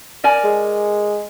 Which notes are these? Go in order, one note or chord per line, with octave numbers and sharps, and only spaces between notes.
A#4 D5 G#5
G#3